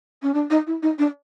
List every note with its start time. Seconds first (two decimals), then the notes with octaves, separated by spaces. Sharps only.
0.23 C#4
0.34 D4
0.50 D#4
0.67 E4
0.83 D#4
0.99 D4